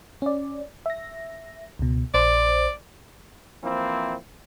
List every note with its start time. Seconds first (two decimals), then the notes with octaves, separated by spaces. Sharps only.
0.22 C#4 D5
0.86 E5 A#6
1.79 C#2 B2
2.14 A#1 C5 D5
3.63 E3 F3 A#3 C4 E4